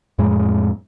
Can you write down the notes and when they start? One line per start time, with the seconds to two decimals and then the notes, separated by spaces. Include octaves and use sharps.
0.19 F2 A2 G#3